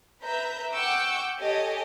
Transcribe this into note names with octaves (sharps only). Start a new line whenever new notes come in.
B4 E5 A#5 G6
F#5 G5 C#6 D6 E6 G6
G4 A4 C#5 D#5 G#5